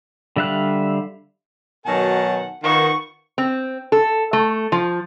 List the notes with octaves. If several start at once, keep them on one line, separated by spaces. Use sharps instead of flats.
D3 G3 E5 F5 F#6
B2 D#3 F#3 A#4 F#5 G#5 A5
D#3 F4 B4 F#5 C#6
C4
A4
A3
F3